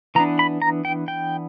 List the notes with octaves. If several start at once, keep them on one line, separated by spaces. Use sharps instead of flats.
E3 B3 D4 A#5
B5
A#5
G5
G5